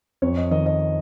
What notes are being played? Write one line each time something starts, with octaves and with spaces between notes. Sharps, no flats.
F2 C#5
D#5
D#3 D#5
D#5